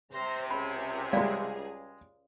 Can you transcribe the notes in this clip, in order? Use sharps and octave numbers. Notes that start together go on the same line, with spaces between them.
C3 C5 A#5
C#2 G#4 B5
G3 G#3 D5 F5